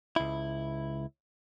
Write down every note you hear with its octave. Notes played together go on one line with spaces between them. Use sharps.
C#2 E4